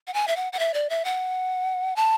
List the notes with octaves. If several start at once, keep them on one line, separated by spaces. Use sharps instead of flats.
F#5
G#5
E5
F#5
F#5
E5
D5
E5
F#5
A5